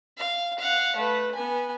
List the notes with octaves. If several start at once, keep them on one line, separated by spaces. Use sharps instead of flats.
F5
F5 F#5
A3 B4
B3 G#5